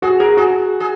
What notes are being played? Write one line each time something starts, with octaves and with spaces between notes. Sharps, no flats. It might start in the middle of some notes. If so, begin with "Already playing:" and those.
F#4 G#4
G#4 A#4
F#4 G#4
G#4